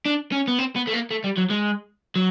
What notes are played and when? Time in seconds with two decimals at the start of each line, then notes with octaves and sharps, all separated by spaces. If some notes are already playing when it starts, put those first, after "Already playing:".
0.06 D4
0.32 C#4
0.48 B3
0.59 C4
0.76 B3
0.87 A3
0.94 A#3
1.11 A3
1.24 G3
1.37 F#3
1.50 G#3
2.16 F#3